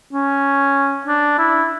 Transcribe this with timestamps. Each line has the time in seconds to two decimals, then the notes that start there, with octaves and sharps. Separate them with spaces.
0.13 C#4
1.07 D4
1.38 E4